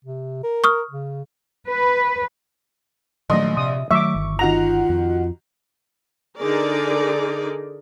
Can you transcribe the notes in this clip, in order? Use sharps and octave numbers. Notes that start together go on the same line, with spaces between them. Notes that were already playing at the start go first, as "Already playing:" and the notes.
C3
A#4
C#6 D#6 F6
C#3
B4
A#1 D#3 F#3 A3 D#5 C6
C3 E5 D#6
D#3 F#3 A3 E5 C#6 D6
G1
D#3 F4 F#4 A#5 F7
F2
D3 D#4 G#4 A#4 D5